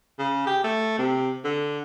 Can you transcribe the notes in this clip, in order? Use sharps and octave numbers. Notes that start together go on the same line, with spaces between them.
C#3
G4
A3
C3
D3